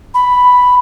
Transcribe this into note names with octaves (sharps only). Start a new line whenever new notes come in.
B5